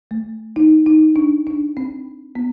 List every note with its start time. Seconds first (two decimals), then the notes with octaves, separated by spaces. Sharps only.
0.11 A3
0.56 D#4
0.86 D#4
1.16 D4
1.47 D4
1.77 C4
2.35 B3